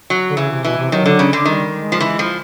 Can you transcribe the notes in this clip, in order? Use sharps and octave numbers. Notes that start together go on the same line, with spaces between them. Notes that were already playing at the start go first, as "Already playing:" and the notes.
F#3
D3
C#3 E3
C3
B2 E3
C3
D#3 F#3
D3
C#3
D3
D#3 G3
G#3
F3
E3
F3